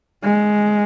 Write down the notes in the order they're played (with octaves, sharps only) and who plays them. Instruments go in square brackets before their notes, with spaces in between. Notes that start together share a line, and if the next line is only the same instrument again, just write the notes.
[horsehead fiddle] G#3